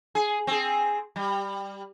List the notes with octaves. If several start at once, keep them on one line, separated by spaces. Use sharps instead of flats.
G#4
C4 G#4
G3